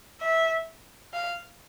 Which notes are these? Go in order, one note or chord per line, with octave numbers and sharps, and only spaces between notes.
E5
F5